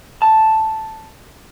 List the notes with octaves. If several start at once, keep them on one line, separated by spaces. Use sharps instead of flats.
A5